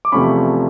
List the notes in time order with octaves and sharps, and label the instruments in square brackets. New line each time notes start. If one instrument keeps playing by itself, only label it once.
[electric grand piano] D6
E2 C3 F3 A3 C#4 B5 C#6